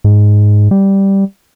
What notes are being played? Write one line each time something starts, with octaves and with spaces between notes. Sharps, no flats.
G#2
G3